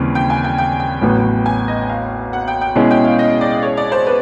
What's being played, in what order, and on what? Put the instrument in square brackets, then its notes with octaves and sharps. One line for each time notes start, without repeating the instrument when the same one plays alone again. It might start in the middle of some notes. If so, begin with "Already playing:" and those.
Already playing: [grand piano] D#2 C#3 E3 G3 C4
[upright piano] G5
G#5
G5
G5
G5
[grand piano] A1 A2 F#3 B3
[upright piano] G#5
D#5
F5
F#5
G5
G5
[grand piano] B2 G#3 C#4 E4 G#4
[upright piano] G5
F5
D#5
D5
C#5
D5
C5
B4